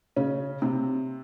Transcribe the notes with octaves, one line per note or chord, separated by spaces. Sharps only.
C#3 C#4
C3 C4